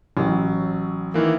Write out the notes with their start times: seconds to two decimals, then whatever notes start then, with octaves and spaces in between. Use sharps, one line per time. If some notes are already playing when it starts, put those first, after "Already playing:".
0.17 A1 F#3
1.14 D#3 E3 A#3